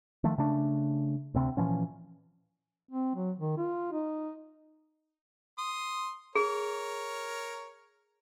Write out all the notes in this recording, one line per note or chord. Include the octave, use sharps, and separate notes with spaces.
D#3 F3 A3
C#3 A3 D4
D2 C3 C4
A#2 E3 F3 C#4
C4
F#3
D#3
F4
D#4
C6 D#6
G#4 A#4 C#5